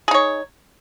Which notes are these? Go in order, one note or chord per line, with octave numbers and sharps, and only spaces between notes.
D#4 G#4 C#5